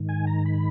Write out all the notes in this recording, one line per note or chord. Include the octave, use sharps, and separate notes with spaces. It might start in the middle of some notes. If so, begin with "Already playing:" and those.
Already playing: G#2 D#3
G#5
A#5
B5